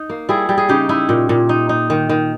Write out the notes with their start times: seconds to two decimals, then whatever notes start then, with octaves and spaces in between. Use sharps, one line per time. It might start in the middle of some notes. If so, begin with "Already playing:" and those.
Already playing: D#4
0.10 A#3
0.29 G3 E4 G#4
0.49 G3
0.58 G#4
0.69 C#3 D#4 G4
0.89 D#4 E4
1.09 A#2
1.29 A#2
1.49 D#4
1.69 D#4
1.90 D#3
2.09 D#3